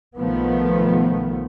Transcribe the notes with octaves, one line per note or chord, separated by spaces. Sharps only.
B1 D#3 F3 A3 B3